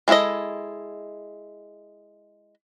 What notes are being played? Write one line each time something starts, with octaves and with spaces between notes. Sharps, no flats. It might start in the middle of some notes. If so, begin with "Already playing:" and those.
G#3 E4 G#4 A4 D#5